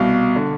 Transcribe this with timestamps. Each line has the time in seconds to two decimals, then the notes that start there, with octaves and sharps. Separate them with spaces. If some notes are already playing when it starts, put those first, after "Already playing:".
Already playing: C2 B2 F5
0.36 D3